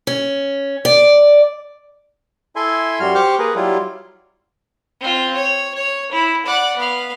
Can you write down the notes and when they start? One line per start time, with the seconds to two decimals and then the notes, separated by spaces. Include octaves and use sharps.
0.07 C#4
0.85 D5
2.56 E4 A4 E5 G#5 C6
3.00 F#2 G3 F#4 C6 F6
3.15 G4 C5 G5 C#6 D6 F6
3.39 A#3 G#4 A#4 B4
3.55 F#3 G3 E4 F4
5.01 C4 F4
5.35 C#5
5.75 C#5
6.12 E4
6.46 D5 F#5
6.77 B3 F5